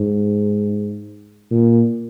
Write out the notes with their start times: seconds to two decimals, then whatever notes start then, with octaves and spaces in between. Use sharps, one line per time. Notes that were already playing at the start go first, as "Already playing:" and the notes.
Already playing: G#2
1.51 A#2